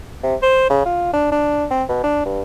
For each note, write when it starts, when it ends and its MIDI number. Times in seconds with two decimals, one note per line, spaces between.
0.23 0.35 48
0.42 0.65 72
0.70 0.83 49
0.85 1.13 65
1.13 1.29 62
1.31 1.65 62
1.71 1.83 60
1.89 2.01 47
2.03 2.23 62
2.25 2.42 43